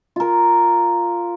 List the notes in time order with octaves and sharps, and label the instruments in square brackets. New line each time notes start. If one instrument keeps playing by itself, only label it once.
[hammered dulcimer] F4 A#4